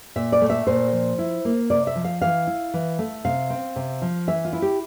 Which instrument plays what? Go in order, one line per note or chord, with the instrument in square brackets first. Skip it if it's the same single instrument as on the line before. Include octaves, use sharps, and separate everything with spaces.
[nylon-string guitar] A#2 E5
D5
A3
E5
A#2 C5
F3
E4
A#3
C3 D5
E5
F3
F5
E3 F5
E4
E3
A3
C3 F5
C4
C3
F3
E3 E5
F4
E4
G4